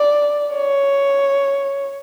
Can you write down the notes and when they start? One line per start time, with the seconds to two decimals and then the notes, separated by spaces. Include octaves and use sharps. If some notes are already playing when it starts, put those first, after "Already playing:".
Already playing: D5
0.54 C#5